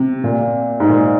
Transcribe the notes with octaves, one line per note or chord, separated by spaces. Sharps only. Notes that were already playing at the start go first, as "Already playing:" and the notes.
Already playing: C3
A#2
G#2
A#2